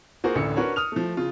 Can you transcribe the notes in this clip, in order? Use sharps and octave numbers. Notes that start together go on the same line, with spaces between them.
A#3 F4 F#4 G#4 A#4 C5
A1 D2 D3 E6 C#7
C#4 D4 F#4 A#4 B4 C#5
D#6 F6 F7
F3 A3
C#3 F4